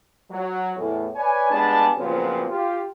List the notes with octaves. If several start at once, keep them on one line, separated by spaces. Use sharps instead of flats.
F#3
E2 A2
B4 C#5 D5 G#5
G3 G#3 B3 D4 G#5 A5
A#2 C#3 F3 F#3 B3 C4
F4 G4